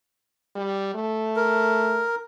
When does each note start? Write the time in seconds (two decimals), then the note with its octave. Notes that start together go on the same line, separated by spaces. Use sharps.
0.56 G3
0.95 A3
1.36 A#4